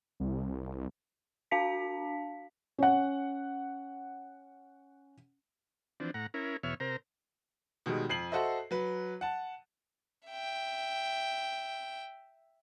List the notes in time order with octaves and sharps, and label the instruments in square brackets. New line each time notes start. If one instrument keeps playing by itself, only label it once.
[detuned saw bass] C2
[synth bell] D4 F#4 F5 A5 B6
[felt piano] C#4 F#5
[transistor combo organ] E3 F3 C4 D4
A2 F#5 A#5
C#4 E4 A#4
E2 B2 C#5 E5 F6
C3 A#4 C5 A#5
[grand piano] B2 D#3 G3 G#3
F2 C7 F#7
F#4 A4 C5 D#5 E5
F#3 B4
F#5 A5
[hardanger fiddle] E5 G5